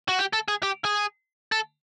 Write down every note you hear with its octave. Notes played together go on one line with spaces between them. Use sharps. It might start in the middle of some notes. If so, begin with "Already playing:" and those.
F#4
G4
A4
G#4
G4
G#4
A4